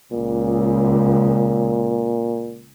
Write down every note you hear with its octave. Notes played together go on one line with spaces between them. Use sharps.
C#2 A#2